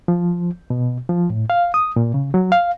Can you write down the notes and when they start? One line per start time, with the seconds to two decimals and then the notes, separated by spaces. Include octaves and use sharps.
0.08 F3
0.70 B2
1.09 F3
1.30 A2
1.50 F5
1.74 D#6
1.96 A#2
2.14 C#3
2.34 F#3
2.52 F5